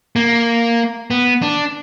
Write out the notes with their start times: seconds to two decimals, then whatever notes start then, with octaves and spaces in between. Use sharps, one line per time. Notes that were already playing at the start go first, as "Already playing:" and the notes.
0.16 A#3
1.11 B3
1.42 D4